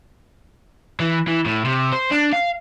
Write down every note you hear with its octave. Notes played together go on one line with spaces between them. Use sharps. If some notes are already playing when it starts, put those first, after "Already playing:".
E3
E3
A2
C3
C5
D4
F5